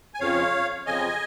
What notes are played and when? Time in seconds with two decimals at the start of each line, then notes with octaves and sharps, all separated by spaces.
0.14 G#5
0.20 F2 C#3 F3 C#5 F5
0.86 F2 C#3 F3 D#5 G#5